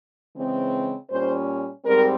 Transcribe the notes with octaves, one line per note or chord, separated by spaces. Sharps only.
C#3 E3 G#3 C4
A#2 G3 C#4 C5
G#2 G3 C4 A#4